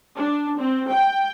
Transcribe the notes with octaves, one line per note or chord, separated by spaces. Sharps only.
D4
C4
G5